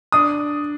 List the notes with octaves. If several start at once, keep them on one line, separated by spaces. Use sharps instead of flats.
D4 D#6